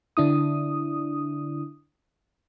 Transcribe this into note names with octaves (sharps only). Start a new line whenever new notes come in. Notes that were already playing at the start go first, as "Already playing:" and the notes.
D3 D4 E4 D#6